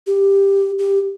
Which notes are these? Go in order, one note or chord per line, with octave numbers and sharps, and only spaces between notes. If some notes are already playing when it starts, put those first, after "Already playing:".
G4
G4